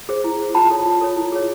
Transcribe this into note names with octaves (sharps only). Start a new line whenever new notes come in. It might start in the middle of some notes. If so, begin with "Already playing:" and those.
G#4 C5
E4
G#4 C5
F4 A5 B5
A4 C#5
F4
A4 C#5
E4
G#4 C#5